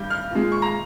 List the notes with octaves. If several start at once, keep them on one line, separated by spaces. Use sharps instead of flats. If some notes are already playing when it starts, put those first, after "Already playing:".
Already playing: G2 G3 G6
F6
A#2 G#3
C#6
A#5